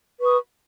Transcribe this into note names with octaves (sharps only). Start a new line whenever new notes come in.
B4 C#6 D#6